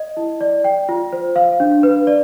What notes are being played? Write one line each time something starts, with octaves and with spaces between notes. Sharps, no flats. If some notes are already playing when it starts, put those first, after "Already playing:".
Already playing: D#5
E4
D5
G5
F4
C5
F5
D4
B4
D5